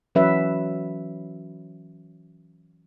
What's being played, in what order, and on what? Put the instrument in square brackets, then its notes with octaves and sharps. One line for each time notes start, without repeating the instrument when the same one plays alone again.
[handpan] E3 F#3 C#4 F#4 B4 E5